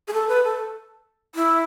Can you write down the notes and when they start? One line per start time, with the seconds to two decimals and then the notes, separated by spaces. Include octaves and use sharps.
0.08 G#4
0.13 A4
0.28 B4
0.44 A4
1.35 E4